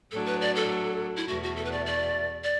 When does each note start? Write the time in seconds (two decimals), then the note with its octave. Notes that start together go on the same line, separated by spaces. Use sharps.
0.11 A2 F#3 D4 A4
0.26 B4
0.41 D5
0.56 A4
1.16 E4
1.28 E2 B2 A3 F#4
1.43 F#4
1.56 A4
1.65 B4
1.72 D5
1.86 D5
2.44 D5